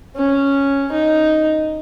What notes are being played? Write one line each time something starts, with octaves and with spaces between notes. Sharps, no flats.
C#4
D#4